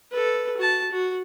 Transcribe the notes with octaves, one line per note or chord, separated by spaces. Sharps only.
A4 B4
F#4 A5
F#4